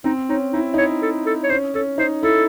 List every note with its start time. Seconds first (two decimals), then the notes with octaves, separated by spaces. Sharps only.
0.04 C4 D#4
0.29 C#4 D#4
0.53 D#4 E4
0.74 D#4
0.78 E4 C#5
1.02 A4
1.26 A4
1.44 C#5
1.49 C#4 C5
1.74 C#4 A4
1.98 D#4 C5
2.23 E4 A4